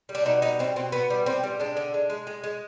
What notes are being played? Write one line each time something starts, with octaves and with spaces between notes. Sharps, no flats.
G3
D4
B2 D#4
G3 D#4
B2 C4
B2 C4
B2 B3
G3
G3 C4
G3
G#3 D4
D3
G#3
G#3
G#3
G#3